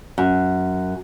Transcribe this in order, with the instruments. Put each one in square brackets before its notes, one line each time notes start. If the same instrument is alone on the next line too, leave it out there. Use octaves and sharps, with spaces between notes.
[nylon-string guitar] F#2